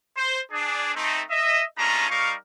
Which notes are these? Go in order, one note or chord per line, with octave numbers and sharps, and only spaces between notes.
C5
D4 G#4
A3 C4 D#4
D#5 E5
G#3 A3 C#4 D4 F4 A#5
G3 D#4 A#4 F5 C#6